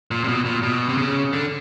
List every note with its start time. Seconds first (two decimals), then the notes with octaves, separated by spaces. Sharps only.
0.11 A#2
0.24 C3
0.28 B2
0.46 A#2
0.63 B2
0.89 C3
0.98 C#3
1.33 D3